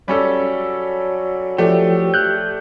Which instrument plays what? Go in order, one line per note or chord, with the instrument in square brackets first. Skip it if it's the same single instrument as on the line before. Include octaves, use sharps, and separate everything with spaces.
[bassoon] F#3 [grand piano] G3 C#4 A4
[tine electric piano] F3 [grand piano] A3 D4 A4 [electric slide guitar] G4
[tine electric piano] F#6 G6